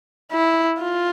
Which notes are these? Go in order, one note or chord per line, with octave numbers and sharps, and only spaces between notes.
E4
F4